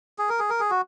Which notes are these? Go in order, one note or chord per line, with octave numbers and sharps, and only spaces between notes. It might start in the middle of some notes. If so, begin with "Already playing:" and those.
G#4
A#4
G#4
A#4
G#4
F#4